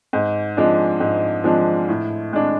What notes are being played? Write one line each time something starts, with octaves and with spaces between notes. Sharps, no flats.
G#2
F3 G#3 D4
G#2
F3 G#3 D4
A2
G#3 D4